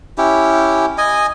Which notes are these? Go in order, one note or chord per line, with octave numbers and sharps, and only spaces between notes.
C#4 E4 G4
D#5 G#5